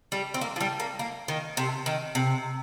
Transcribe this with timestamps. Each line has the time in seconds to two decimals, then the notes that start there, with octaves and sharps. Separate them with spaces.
0.12 G3
0.34 C4
0.41 A#3
0.56 F3
0.61 G3
0.80 A#3
0.99 A#3
1.28 D#3
1.57 C3
1.86 D#3
2.15 C3